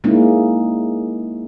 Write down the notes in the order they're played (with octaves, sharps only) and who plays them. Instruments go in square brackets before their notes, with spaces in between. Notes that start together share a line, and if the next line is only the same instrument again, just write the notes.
[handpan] G#3 A#3 C#4 D#4 E4